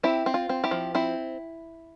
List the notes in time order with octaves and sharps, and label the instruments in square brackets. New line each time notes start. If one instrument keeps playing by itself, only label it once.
[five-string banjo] C4 E4 G4
C4
F4
C4
E4 G4
F3
C4 E4